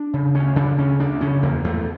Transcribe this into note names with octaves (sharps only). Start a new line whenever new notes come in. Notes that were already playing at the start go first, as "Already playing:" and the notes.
Already playing: D4
C#3
D2 C#4
C#3 D4
D2 C#4
D2 D4
C#3 C#4
E2 A#3
E2 A3